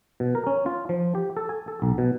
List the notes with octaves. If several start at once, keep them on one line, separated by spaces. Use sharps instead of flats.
B2
A#4
C#4
F4
F3
G4
A4
G#5
A4
B1
B2